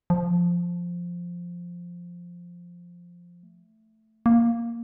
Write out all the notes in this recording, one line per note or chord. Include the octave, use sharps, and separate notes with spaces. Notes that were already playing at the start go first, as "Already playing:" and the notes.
F3
A3
A#3